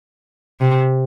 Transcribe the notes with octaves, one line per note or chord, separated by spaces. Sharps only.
C3